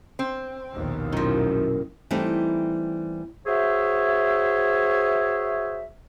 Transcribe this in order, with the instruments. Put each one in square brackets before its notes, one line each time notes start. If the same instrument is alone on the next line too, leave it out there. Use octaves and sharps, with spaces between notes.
[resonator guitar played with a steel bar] C4
[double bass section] A#1 D#2 B2
[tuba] F#2 [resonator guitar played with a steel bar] D#3 F3 [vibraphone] E4 A#4
[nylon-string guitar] E3 G3 A3 C4 D#4
[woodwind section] F#4 G#4 C5 C#5 E5